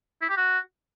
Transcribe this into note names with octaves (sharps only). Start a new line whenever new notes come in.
E4
G4
F#4